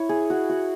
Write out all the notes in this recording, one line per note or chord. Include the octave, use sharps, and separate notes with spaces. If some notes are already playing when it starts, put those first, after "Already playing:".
Already playing: E4 C#5
G#4
F#4
F#4